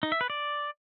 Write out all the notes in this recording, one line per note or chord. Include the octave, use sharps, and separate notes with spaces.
D#4
E5
B4
D5